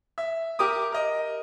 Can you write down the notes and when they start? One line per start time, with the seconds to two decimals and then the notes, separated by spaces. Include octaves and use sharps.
0.18 E5
0.59 G4 A#4 D6 D#6
0.92 A#4 D#5